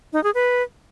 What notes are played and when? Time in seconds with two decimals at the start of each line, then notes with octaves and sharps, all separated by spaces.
0.13 D#4
0.23 G#4
0.34 B4